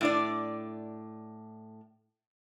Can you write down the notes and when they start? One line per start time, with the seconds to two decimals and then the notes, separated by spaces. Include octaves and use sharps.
0.01 A2 D4 D5